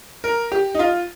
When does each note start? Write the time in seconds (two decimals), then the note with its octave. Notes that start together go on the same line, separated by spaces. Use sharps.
0.24 A#4
0.52 G4
0.75 D#4
0.79 F4